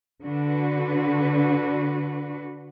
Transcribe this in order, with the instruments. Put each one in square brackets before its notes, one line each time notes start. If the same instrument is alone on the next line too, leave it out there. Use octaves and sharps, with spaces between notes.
[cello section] D3 D4 F#4 B4